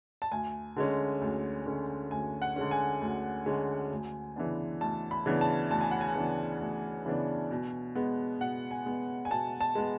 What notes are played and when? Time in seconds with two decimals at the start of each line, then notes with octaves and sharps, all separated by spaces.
0.22 A5
0.32 D2 G#5
0.76 D3 G#3 C#4
1.21 D2
1.66 D3 G#3 C#4
2.11 D2 G#5
2.42 F#5
2.56 D3 G#3 C#4
2.71 G#5
3.01 D2
3.46 D3 G#3 C#4
3.92 D2
4.36 C#3 E3 B3 D4
4.81 D2 A5
5.11 B5
5.26 C#3 E3 B3 D4
5.41 A5
5.71 D2 A5
5.81 G#5
5.91 F#5
6.01 G#5
6.16 C#3 E3 B3 D4
6.60 D2
7.06 C#3 E3 B3 D4
7.51 B2
7.95 G#3 B3
8.41 B2 F#5
8.71 G#5
8.86 G#3 B3
9.25 G#5
9.30 B2 A5
9.61 A5
9.75 G#3 B3